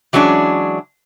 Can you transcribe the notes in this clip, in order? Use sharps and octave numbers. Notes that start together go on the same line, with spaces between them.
E3 F#3 G#3 C#4 D4